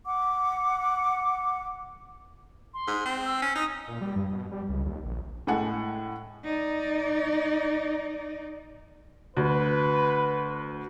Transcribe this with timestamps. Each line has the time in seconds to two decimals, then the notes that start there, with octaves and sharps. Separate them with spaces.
0.07 F#5 D6
2.74 C6
2.88 G#2
3.06 C4
3.25 E6
3.42 C#4
3.55 D#4 D#6
3.88 A#2
4.01 G3
4.16 G2
4.33 B2
4.52 G3
4.69 C#2
4.85 D#2
5.05 A#1
5.47 A2 G#3 A4 F#5 G#5
6.45 D#4 D5
9.37 D2 B4